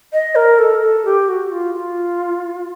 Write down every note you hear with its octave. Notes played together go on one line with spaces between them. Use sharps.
D#5
A#4
A4
A4
G4
F#4
F4
F4